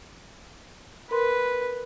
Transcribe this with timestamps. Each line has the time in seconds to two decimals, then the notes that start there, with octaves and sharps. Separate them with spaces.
1.11 A#4 B4 C6